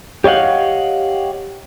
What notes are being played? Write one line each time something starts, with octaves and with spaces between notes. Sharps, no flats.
G4 C#5 D#5 F5 F#5